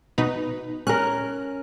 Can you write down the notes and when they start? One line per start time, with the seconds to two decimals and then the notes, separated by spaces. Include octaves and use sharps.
0.18 B2 D#4 B4
0.87 C#4 A#4 F#6